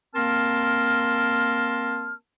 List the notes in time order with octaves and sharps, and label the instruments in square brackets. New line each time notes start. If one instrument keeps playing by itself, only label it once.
[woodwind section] A#3 C4 A#4 A5 C6 F6